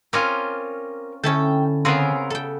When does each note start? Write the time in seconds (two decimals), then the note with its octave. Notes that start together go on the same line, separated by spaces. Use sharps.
0.13 C4 C#4 F4 A#4 D6
1.24 D3 C#4 E4 A4 G5 A5
1.85 C#3 B3 C4 G#4 A#4
2.30 A4 G5